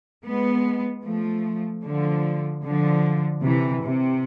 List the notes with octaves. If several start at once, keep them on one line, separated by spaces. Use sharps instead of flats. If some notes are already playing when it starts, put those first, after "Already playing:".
G#3 B3
F3 A3
D3 F3
D3 F3
C3 E3
C3